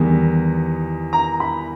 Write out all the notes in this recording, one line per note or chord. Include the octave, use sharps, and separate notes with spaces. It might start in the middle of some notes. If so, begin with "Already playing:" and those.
Already playing: E2 D#3 G3 B3
A#5
B5